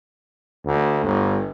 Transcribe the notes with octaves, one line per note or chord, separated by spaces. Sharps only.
D2
G1